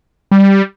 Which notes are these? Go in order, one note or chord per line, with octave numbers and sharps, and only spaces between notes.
G3